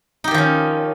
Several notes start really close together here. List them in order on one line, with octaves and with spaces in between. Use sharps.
D#4 G4 D#3 F3 C#4